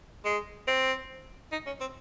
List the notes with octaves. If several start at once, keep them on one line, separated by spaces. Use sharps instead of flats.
G#3
C4
D#4
C#4
C4